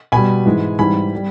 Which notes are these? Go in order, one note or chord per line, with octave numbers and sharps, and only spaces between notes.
B2 G3 G#5 B5
G#2 E3 G#3
G#2 E3 G3 G#5 B5
G3